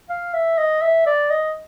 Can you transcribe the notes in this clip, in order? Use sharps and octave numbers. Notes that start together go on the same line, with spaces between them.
F5
E5
D#5
E5
D5
D#5